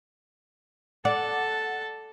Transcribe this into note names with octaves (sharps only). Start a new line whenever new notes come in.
A4 D5 F#5 A5